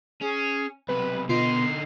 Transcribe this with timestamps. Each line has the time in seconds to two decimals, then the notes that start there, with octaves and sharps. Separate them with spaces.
0.21 C#4 G#4
0.89 B1 C3 B4 B5
1.29 B2 D3 B3 D#4 F4 C6 C7